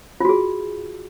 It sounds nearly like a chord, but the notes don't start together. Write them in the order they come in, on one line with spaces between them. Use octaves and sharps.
F4 F#4 G#4